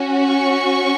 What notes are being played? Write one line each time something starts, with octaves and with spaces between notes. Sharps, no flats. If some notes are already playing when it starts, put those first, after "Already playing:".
Already playing: C#4 F#4
C#6